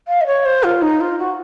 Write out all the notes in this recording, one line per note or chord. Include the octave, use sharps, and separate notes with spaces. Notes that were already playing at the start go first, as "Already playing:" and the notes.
F5
D#5
C#5
C5
F4
D#4
F4
F#4